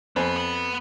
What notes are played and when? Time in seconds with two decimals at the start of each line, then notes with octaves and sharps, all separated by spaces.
0.16 F2 B3 C5 G#5
0.36 B3 B4